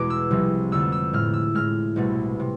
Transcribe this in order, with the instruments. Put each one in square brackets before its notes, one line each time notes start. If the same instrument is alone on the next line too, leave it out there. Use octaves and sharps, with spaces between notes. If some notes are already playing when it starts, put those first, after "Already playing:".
Already playing: [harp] E2 B2 G#3 D6
E6
C2 C3 F3 G#3
F2 D3 A3 E6
E6
A2 G#3 F6
E6
A2 G#3 F6
C2 B2 A3
C3